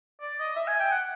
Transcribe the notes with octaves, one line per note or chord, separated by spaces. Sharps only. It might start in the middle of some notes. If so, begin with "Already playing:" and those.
D5
D#5
E5
G#5
G5
F#5